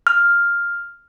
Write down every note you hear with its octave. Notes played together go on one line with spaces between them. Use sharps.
F6